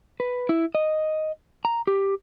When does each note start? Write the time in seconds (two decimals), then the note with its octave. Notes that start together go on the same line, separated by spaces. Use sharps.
0.20 B4
0.49 E4
0.75 D#5
1.65 A#5
1.87 G4